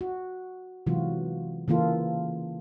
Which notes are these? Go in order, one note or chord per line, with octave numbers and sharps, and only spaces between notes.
F#4
C3 E3 F#3 G#3 F4 F#4
C#3 E3 A#3 F4 A4